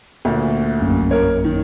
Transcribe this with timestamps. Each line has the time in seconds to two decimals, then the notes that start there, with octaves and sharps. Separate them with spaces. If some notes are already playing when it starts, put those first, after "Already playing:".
0.25 D2 A#2
0.82 A#1 F#2 A#3
1.11 A#4 C#5
1.44 D#3